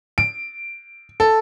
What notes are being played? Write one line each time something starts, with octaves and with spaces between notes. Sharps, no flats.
D7
A4